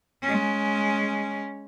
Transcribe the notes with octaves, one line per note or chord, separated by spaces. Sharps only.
G#3 C#4